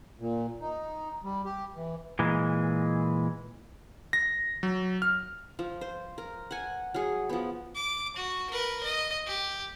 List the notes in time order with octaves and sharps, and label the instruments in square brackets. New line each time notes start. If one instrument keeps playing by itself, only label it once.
[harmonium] A#2
D#4
G3
G4
E3
[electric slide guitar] A#2 E3 G#3
[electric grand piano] A#6
F#3
F6
[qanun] F3
C5
A#4
F#5 G#5
F#3 G#4
F3 B3
[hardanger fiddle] D6
F#4
A#4 B4
D#5
G4